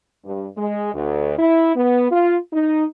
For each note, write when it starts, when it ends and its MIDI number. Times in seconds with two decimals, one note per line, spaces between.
0.24 0.46 43
0.57 0.92 56
0.93 1.35 38
1.38 1.75 64
1.76 2.07 59
2.11 2.37 65
2.53 2.84 63